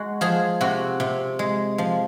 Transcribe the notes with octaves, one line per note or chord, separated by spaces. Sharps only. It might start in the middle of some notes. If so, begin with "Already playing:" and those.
Already playing: G#3 F#4
F3 G#4
C3 F#4
C3
G#3
F3